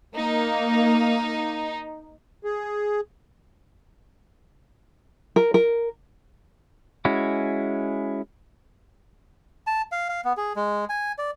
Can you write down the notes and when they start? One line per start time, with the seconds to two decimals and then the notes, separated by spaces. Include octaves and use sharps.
0.15 A#3 D#4
2.44 G#4
5.36 A#4
5.54 A#4
7.05 G#3 C#4 E4 F#4
9.67 A5
9.92 F5
10.09 F5
10.25 B3
10.37 G#4
10.56 G#3
10.89 G#5
11.18 D5